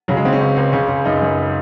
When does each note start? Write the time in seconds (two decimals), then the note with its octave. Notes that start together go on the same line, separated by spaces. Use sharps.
0.08 C#3 F#3
0.17 G#3
0.25 C#3 C4
0.32 C#4
0.41 C#2
0.57 C#2
0.73 C#3
0.89 C#3
1.05 F#2 D#4
1.22 F#2